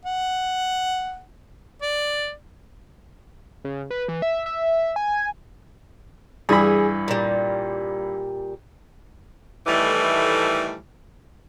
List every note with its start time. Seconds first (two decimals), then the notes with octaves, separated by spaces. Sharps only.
0.05 F#5
1.82 D5
3.64 C#3
3.90 B4
4.08 E3
4.22 E5
4.46 E5
4.96 G#5
6.49 G2 E3 G#4 B5
7.08 A#2 G3
9.67 A2 D#3 E3 G3 A3